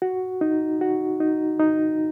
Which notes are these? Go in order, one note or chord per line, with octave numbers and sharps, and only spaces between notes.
F#4
D#4
F#4
D#4
D#4